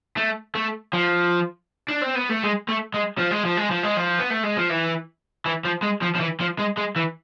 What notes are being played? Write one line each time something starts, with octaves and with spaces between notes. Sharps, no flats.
A3
A3
F3
D4
C4
B3
A3
G#3
A3
G#3
F3
G#3
F3
G#3
F3
G#3
F3
B3
A3
G#3
F3
E3
E3
F3
G#3
F3
F3
E3
F3
G#3
G#3
E3